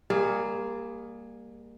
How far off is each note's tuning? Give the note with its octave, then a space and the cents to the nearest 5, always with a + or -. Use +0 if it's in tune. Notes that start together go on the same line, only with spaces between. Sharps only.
G3 +35 A#3 +0 G#4 +0